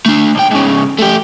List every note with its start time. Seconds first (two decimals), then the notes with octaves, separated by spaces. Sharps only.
0.06 A3 D4
0.35 B1 G5
0.51 G#2 C#3
0.98 A3 G4